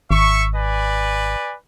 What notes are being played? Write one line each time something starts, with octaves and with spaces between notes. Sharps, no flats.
G#1 E5 C#6
B4 D5 G#5